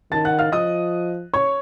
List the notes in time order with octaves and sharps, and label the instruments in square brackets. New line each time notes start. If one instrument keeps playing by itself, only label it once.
[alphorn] D#3 [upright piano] A5 A6
[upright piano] F#5 F#6
F5 F6
[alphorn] F3 [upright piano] D#5 D#6
[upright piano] C#5 C#6